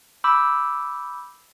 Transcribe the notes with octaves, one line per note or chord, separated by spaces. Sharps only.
B5 D6 E6 G6